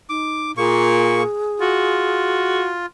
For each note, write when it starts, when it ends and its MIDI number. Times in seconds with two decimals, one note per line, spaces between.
0.09 0.53 63
0.09 0.51 86
0.57 1.22 46
0.57 1.23 58
0.57 2.61 68
0.57 1.23 85
1.60 2.86 65
1.60 2.71 66